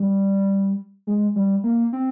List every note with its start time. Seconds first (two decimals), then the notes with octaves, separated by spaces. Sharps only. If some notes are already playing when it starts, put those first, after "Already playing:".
Already playing: G3
1.07 G#3
1.36 G3
1.64 A#3
1.93 C4